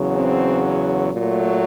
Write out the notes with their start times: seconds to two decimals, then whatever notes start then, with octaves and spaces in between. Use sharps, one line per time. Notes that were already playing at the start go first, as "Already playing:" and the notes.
Already playing: E2 C#3 F#3
0.15 C4
1.14 A#2 F#3 A3